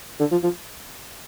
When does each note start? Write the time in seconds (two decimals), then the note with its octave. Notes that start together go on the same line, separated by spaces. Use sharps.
0.20 D3
0.32 F3
0.44 F3